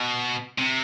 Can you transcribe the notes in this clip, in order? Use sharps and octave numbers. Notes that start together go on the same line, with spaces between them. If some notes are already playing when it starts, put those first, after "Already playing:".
Already playing: B2
C3